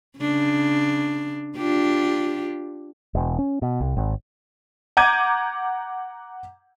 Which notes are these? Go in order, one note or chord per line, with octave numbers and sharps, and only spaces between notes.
C#3 D4
D4 F4 G4
E1
C#4
B2
C2
G#1
F#5 A#5 D6 G6 G#6 D#7